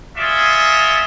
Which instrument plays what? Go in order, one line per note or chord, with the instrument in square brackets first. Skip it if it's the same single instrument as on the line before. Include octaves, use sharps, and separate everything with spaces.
[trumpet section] F4 F#4 G#4 D5 E5